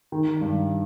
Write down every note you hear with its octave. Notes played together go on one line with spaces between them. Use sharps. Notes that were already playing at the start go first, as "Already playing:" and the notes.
D#3
G2